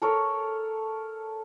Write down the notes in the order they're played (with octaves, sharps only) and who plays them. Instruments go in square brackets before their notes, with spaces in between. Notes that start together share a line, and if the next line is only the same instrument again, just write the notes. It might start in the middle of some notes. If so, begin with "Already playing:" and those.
[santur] A4 A#4 C#5